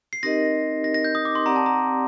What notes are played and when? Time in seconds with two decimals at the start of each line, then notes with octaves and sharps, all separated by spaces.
0.13 C7
0.23 C4 D#4 G4 A#4 D#5 A#6
0.84 A#6
0.94 A#6
1.04 G6
1.15 D#6
1.25 D6
1.35 C6
1.46 C4 G4 D5 F#5 A#5
1.56 A5
1.66 A#5